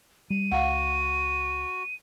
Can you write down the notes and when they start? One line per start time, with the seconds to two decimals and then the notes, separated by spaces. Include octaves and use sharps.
0.30 G3 D#7
0.52 C#2 F#4 F5 F#5